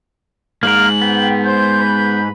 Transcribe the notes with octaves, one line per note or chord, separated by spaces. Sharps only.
G#2 G#3 A#3 A#4 F#7
B3 G5
C5 G6
B4 B5